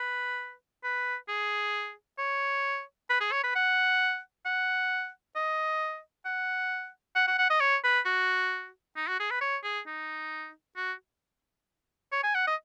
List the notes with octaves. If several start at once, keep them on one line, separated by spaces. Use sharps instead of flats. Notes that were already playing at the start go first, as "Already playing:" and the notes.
Already playing: B4
B4
G#4
C#5
B4
G#4
C#5
B4
F#5
F#5
D#5
F#5
F#5
F#5
F#5
D#5
C#5
B4
F#4
D#4
F#4
G#4
B4
C#5
G#4
D#4
F#4
C#5
G#5
F#5
D#5